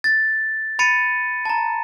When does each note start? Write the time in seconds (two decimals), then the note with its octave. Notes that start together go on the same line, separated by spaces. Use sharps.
0.04 A6
0.79 B5 A6 C#7 D#7
1.45 A5 A#5